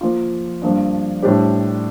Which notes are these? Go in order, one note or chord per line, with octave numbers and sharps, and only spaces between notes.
F3 A#3 F4
G2 F3 A#3 D4
A2 G3 D4 G4 C5